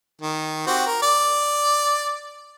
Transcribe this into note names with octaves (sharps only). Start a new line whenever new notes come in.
D#3
C4 F#4 G4
A#4
D5